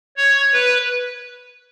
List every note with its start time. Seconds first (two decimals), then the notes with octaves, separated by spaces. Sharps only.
0.17 C#5
0.53 B4